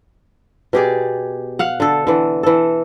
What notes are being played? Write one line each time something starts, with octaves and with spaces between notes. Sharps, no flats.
B2 G4 G#4 D5
F5 F#5
D3 A4
D3 E3
E3 A4